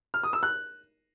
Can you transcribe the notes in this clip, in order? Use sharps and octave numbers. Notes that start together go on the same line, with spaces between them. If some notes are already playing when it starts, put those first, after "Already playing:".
F6
D#6
E6
F#6